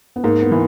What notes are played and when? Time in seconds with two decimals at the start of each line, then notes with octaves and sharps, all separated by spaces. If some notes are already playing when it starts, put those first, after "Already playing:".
0.16 B3
0.24 G#2 A#3
0.42 B3
0.52 E3